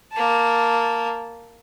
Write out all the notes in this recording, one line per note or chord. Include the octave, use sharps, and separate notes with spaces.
A#3 A5